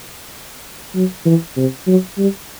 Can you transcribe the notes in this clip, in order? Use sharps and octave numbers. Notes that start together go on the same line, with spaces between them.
F#3
E3
C3
F#3
G3